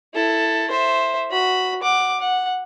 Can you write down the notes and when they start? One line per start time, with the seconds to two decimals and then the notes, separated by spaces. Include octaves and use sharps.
0.14 E4 A4
0.70 C5 E5
1.30 F#4 B5
1.82 F#5 D6
2.20 F#5